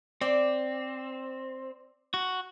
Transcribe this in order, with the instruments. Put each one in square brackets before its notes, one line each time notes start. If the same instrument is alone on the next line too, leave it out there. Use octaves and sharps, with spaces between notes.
[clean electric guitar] C4 [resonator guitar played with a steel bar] D5
[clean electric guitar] F#4